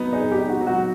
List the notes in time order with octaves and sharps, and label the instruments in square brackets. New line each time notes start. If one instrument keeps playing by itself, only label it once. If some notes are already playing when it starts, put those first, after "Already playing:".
Already playing: [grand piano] F#3 B3 D#4
[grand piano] D#4 [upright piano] G#4
[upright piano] G#4
G4
[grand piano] D#4
[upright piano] F#4
[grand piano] F#3
[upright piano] F#4